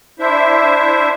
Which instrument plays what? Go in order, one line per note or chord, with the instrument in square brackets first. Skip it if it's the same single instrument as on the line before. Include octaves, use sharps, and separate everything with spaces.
[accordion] D4 E4 C5 E5